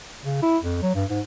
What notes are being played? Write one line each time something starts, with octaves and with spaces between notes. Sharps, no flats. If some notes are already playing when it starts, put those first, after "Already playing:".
C#3
E4
F2
F#3
G2
G#2